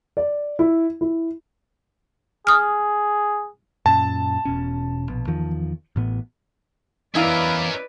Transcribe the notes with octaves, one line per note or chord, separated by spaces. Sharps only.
D5
E4
E4
G#4 D#6 F6
F#2 A#2 C#4 A5
E1 B2 C#4
A#1 B2
E2 D#3 F3
A1 A2 B3
E2 C#4 E4 A#4 B4 D5 D#5 F5